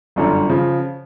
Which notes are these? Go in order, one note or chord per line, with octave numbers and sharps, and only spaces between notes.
G1 F#2 D3
C#3 F3